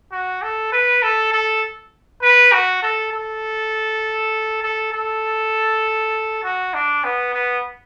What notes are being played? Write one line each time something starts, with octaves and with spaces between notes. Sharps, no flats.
F#4
A4
B4
A4
A4
B4
F#4
A4
A4
A4
A4
F#4
D4
B3
B3